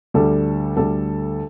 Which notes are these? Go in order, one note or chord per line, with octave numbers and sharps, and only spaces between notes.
D2 D3 G3 A4
D2 D3 G3 A4